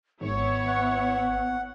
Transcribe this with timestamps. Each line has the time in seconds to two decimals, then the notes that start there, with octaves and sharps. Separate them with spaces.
0.21 G#1 B3 E4 C#5
0.67 F#5